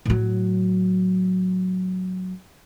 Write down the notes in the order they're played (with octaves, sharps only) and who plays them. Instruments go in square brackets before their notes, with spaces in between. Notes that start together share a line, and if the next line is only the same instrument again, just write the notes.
[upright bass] A2 F#3